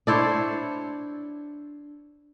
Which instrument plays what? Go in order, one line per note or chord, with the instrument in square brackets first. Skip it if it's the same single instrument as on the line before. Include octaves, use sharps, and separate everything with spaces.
[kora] D4 E4 C5 C#5